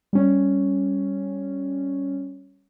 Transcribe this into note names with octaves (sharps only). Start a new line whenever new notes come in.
G3 C#4